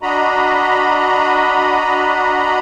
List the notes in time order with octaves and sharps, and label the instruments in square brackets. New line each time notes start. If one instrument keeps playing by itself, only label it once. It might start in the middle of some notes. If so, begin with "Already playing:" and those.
[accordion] D4 F#4 D#5 A#5 B5